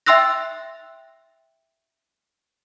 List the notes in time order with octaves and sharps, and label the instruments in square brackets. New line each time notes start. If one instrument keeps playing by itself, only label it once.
[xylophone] E5 G5 C6 E6 F#6 A#6